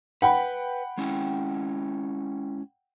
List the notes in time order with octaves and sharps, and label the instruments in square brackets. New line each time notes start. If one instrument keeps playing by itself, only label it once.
[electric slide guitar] B4 [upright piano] F#5 G5 B5
[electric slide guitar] G#3 C#4 E4